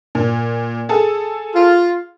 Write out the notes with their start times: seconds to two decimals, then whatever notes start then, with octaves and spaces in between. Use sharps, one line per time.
0.15 A#2
0.89 G#4 A4
1.55 F4